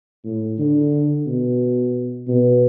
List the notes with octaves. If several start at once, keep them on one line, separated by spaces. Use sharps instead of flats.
A2
D3
B2
B2